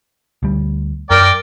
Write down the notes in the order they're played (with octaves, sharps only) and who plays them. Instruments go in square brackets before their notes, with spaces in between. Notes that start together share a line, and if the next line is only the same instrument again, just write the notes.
[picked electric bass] D2 G3
[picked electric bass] F#2 [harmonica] A#4 D5 G5